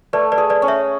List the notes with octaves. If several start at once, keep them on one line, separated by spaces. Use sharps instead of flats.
A3 B4 D5
B4 D5
G#4
B4 D5
C#4
C#5 E5